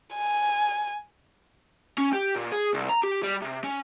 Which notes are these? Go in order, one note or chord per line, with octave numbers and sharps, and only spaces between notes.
G#5
C#4
G4
A#2
G#4
C2
A#5
G4
G3
C3
C#4